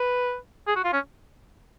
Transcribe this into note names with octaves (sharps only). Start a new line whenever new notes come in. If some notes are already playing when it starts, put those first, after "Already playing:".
Already playing: B4
G#4
F#4
F4
C#4